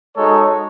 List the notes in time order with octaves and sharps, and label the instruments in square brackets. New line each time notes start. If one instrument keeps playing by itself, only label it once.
[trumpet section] G#3 D#4 F#4 A4 C#5